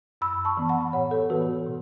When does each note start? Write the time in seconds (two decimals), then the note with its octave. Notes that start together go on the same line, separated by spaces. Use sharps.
0.21 F#2 B5 E6
0.45 A5 C#6
0.57 E3 B3
0.69 F#5 B5
0.93 A2 C#5 F#5
1.11 A4 C#5
1.29 E3 B3 F#4 B4
1.66 B2